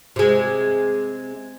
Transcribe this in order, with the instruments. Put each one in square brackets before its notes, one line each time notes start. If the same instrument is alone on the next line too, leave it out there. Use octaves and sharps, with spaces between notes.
[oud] C3 G#3